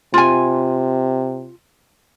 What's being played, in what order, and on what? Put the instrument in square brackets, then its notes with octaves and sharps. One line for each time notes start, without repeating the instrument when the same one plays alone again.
[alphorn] C3 [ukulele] F4 G#5